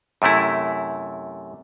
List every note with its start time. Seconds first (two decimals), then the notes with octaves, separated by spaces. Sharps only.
0.22 F#2 C3 A3 E4